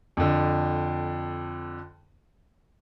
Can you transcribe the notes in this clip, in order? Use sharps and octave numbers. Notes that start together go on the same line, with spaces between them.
F2 D3